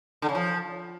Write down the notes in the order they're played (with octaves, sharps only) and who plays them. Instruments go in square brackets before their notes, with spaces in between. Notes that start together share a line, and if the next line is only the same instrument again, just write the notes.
[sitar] D3
C#3
F3